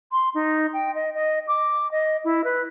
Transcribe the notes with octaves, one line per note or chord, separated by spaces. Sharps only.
C6
D#4
G5
D#5
D#5
D6
D#5
E4
B4